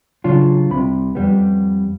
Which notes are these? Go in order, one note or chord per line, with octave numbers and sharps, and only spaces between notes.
C#3 F#3 D4 F4
C2 C3 B5
F2 G3 B3